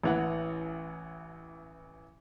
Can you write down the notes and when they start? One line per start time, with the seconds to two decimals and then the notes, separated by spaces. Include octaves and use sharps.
0.04 A1 E3 F#5